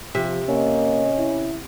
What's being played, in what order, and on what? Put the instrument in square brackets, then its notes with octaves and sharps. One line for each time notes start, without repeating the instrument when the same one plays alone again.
[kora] C3 E5 [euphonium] F3
[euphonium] A#3 [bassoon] C#4 [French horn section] D#5
[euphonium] E4